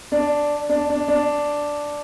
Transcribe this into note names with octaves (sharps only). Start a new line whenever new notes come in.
D4
D4
D4
D4